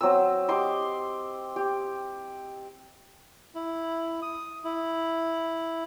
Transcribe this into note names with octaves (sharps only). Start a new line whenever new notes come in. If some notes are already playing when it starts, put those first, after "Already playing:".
F#3 C4 D#6 E6
G4 D#5 C6 D6
G4
E4
D#6
E4